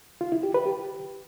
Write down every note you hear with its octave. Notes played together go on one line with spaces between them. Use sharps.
F4
E4
G4
B4
G4